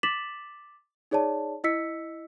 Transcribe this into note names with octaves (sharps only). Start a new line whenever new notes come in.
D6 A6 B6 E7 F#7
D#4 G#4 C#5 D5 A5
E4 D#5 E6 B6 C#7